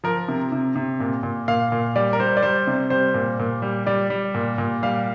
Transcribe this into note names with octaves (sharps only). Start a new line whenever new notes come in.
F3 A#4
C3
C3
C3
A#2
A#2
A#2 F5
A#2
G3 D5
A#4
G3 C5
D5
G3 C5
C3
G3 C5
A#2
A#2
G3
G3 D5
G3
A#2
A#2
G3 F5